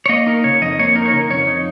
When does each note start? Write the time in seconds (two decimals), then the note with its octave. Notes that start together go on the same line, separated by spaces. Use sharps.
0.06 C#5
0.09 A#3 D#5
0.26 D#4 A#4
0.44 C#3 C#5
0.62 F2 D#5
0.79 A#3 C#5
0.95 D#4 A#4
1.06 C#5
1.12 C#3 A#4
1.30 F2 C#5
1.47 D#4